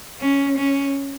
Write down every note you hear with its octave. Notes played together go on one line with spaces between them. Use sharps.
C#4
C#4